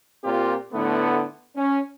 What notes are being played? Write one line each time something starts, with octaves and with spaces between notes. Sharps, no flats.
A#2 C4 F4 G4 A#4
A2 D3 A3 B3
C#4